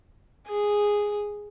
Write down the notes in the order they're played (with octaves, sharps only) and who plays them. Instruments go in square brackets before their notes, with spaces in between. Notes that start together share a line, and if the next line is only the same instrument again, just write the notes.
[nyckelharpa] G#4